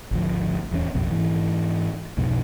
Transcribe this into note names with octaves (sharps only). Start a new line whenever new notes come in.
G#1 D2 F3
D1 E2 F3 C#4
A#1 F2 B2
G#2 E3
B1 F2 G#2 B2